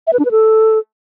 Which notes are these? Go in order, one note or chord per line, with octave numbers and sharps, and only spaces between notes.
E5
B4
D4
B4
A4